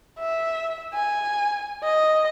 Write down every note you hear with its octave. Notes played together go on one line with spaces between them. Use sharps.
E5
G#5
D#5